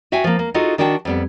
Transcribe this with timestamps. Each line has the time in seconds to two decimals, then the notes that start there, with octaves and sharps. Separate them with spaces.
0.12 F#4 E5 F5 G5 G#5
0.24 F3 A#3
0.39 A#3
0.54 D#4 F4 F#4 G#4 A4 D#5
0.78 D#3 D4 F#4 G5 A5
1.05 F2 G3 B3